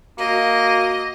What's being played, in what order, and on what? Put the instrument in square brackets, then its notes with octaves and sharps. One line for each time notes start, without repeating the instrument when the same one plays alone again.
[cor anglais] A#3 [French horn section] F#4 [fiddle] D#5